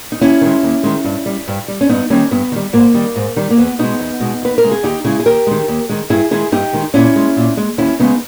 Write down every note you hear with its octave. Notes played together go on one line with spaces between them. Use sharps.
D#4
D#2 C#4 E4
D#3 G#3
D#2
D#3 G#3
G2
G3
G2
G3
C#4
G2 B3 D#4
D#3 G3 A#3 C#4
G2 B3
D#3 G3
G#2 A#3
D#3 G3
G#2
D#3 G3
A#3
E2 B3
B2 G#3 B3 D#4
E2
B2 G#3
D#2 B4
A#4
C#3 G#3
G#4
D#2 D#4 G4
C#3 G#3 E4 G#4
G#4
D#2 G4 A#4
D#3 G#3
D#2
D#3 G#3
G2 E4 G#4
D#3 G#3 E4 G#4
G2 D#4 G4
D#3 G#3
A#2 C#4 E4
G#3
A#2
G#3
D#2 C#4 E4
C#3 G#3 B3 D#4